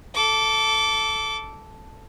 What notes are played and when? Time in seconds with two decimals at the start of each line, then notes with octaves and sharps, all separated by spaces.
0.14 A4 D6